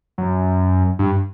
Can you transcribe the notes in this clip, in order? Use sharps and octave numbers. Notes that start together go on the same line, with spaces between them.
F#2
G2